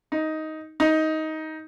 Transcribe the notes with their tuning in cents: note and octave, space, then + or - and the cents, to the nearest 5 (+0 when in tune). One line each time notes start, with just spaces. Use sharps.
D#4 +10
D#4 +15